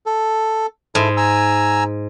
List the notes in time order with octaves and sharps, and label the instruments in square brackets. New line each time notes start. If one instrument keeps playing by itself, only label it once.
[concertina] A4
[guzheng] G#2 [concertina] E4 A4
[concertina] G#5 A#5 E6